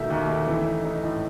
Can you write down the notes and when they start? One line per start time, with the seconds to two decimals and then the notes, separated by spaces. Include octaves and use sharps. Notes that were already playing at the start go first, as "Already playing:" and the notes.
Already playing: B2 D#3 A3 E5
0.10 D#2
0.28 A3
0.47 E3
0.66 D#4
0.85 D#4
1.03 A2